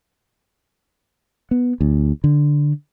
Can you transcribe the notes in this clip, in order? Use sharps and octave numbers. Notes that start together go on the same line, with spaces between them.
B3
D2
D3